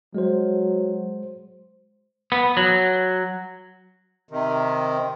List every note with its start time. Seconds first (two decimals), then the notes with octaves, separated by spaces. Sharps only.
0.15 F#3 G#3 C5
2.32 B3
2.57 F#3
4.29 C3 D#3